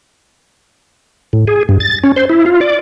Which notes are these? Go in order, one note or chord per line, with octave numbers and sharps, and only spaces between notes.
A2
G#4
G2
A6
C#4
C5
E4
F4
D5